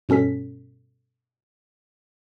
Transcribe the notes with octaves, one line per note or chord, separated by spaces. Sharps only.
G2 B2 C#4 A4 B6